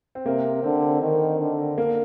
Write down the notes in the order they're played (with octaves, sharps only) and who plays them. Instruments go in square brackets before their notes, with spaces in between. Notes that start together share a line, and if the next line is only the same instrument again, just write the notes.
[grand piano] C4
[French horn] C3 [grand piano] A#3
[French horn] D3 [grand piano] C4
[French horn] D#3
D3
[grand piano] A#3